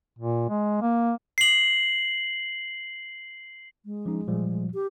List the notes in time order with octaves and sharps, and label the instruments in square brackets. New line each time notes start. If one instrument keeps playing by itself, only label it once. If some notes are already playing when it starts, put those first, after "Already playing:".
[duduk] A#2
G#3
A#3
[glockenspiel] C7 F#7
[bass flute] G#3
[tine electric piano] F3 C#4 D#4
A#2 F3 G3
[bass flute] G4